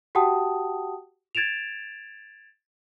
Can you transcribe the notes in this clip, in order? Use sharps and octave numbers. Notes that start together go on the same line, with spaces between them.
F#4 G4 F#5 G5 A5 D#6
G#6 A6 D7 E7 F7